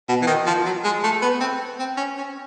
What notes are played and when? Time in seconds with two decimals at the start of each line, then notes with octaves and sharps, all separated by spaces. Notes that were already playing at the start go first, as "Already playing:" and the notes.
0.09 B2
0.22 E3
0.27 D#3
0.46 F3
0.65 F#3
0.84 G#3
1.03 A3
1.22 B3
1.41 C4
1.79 C4
1.97 C#4
2.17 C#4